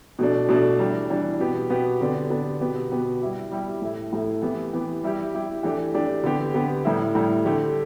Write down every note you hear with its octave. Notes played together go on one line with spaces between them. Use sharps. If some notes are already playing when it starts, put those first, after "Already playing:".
B2 A3 D4
B2 A3 D4
E3 G3 D4
E3 G3 D4
B2 B3 G4
B2 B3 G4
D3 B3 D4 G4
D3 B3 D4 G4
B2 B3 G4
B2 B3 G4
G3 E4 G4
G3 E4 G4
A2 A3 E4
A2 A3 E4
E3 B3 G4
E3 B3 G4
G3 E4 G4
G3 E4 G4
E3 A3 D4 G4
E3 A3 D4 G4
D3 B3 G4
D3 B3 G4
A2 G3 E4
A2 G3 E4
D3 A3 G4